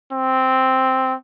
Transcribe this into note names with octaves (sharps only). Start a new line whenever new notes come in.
C4